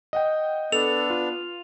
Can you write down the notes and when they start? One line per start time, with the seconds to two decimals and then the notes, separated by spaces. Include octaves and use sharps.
0.13 D#5 F#5 G5
0.72 B3 D4 A4 F7
1.10 F4